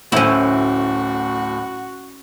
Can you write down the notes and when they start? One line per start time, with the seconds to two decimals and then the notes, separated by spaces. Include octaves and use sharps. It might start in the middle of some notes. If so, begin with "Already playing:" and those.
0.12 D1 A2 C#4 E4 F#4 C5